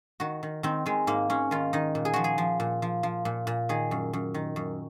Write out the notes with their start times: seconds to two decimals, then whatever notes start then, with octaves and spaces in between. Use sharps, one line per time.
0.20 D#3 F#4
0.43 D#3
0.63 D#3 C4
0.86 D#3 G#3
1.07 G#2 A#3
1.30 G#2 C#4
1.51 D#3 F4
1.73 D#3 D#4
1.95 A#2
2.05 G#4
2.14 F3 F#4
2.24 G#4
2.38 F3
2.60 A#2
2.82 F3
3.03 F3
3.25 A#2
3.47 A#2
3.69 D#3 G#4
3.91 F#2
4.13 F#2
4.34 D#3
4.56 F#2